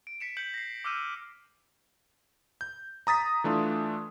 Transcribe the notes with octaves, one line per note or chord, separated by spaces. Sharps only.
D7
B6 C#7 E7
G6 B6 C#7 F#7
A#6 C7
D6 E6 F6 G6 D#7
G6
A#5 D#6 A6 B6
E3 A3 D4 F4